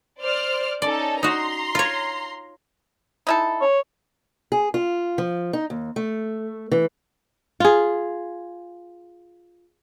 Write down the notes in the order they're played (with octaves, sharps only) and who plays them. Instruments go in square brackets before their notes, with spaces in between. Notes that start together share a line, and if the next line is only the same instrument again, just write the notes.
[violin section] C5 D5 F6
[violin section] C#4 D#4 A4 [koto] D5
[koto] D#4 F#4 [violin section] A#5 C6
[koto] F4 C#5
[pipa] D#4 E4 A4
[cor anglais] C#5
[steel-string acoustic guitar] G#4
F4
F3
D#4
D#2
A3
E3
[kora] F4 G#4